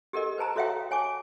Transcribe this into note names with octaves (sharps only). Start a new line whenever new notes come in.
G4 A4 A#4 D#5
B4 C5 A5 A#5
F#4 A4 C#5 E5 F5 G5
C#5 G#5 A5 D6